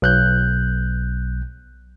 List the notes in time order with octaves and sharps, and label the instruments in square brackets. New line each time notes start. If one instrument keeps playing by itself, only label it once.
[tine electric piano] B1 F#6 G6